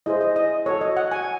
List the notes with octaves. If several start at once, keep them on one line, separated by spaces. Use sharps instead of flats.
E4 G#4 C5 D#5
D#5
D#5
F#4 A4 C#5
D#5
F#5
G#5